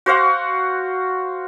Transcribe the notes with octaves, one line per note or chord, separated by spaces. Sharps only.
F#4 C5 F5 F#5